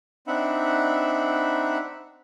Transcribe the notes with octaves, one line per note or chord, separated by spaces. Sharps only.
C4 D4 D#4 E5 F#5 B5